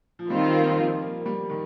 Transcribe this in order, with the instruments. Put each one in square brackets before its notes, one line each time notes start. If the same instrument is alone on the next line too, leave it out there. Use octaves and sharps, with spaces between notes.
[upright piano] F3
[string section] D#3 C4 F4 [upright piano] G3
[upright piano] A#3
F3
A#3
G3
D#3